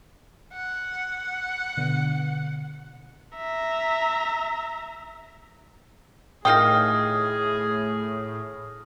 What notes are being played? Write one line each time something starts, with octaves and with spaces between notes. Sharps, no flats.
F#5
B2 D3
E5 A#5
A2 D#3 F4 G#4 G5 D#6 F6 A#6